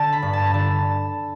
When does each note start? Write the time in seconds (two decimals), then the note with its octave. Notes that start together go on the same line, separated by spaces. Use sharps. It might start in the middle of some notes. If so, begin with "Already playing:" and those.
Already playing: D3 A5
0.13 B5
0.22 G2
0.33 A5
0.53 D3 A5